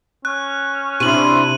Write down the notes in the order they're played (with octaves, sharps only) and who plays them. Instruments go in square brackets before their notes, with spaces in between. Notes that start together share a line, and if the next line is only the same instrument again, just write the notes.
[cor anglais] C#4 [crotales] F#6
[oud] C3 [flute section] D4 E4 C6 [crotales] D#7 F#7